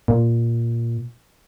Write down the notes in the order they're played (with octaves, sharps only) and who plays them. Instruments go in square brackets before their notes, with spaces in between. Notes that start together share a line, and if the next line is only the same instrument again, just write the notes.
[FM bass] A#2